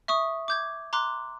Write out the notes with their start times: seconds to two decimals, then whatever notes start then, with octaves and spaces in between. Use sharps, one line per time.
0.08 E5 C#6 D#6
0.48 D6 G6 G#6
0.93 A#5 C6 D6 F#6